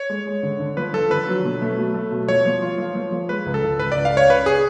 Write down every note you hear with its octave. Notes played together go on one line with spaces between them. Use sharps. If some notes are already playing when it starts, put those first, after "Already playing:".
Already playing: C#5
G#3
G#3
D3
D3
F3 B4
F3 A4
D3 B4
F#3
B2
A3
F#3
A3
B2
F3 C#5
F3
F4
F3
F3
F3
G#3 B4
C#2
A4
C#2
C#2 B4
C#2 D5
F5
C#2 C#5
C#3 B4
G#4